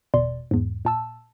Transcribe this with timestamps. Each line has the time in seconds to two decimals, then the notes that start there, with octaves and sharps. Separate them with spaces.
0.14 G1 E2 B2 D5 C6
0.51 E2 G#2
0.85 A#2 A5 E6